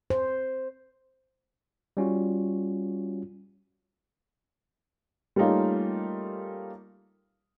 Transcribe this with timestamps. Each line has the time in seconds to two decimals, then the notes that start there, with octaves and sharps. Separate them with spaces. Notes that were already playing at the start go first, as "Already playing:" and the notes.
0.10 C5
1.97 G3 C#4 F4 F#4
5.36 G3 A3 A#3 C#4 D#4 F4